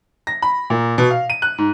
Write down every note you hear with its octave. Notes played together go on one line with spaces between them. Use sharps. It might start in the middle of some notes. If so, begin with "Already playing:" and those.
A#6
B5
A#2
B2
F5
D#7
F#6
G#2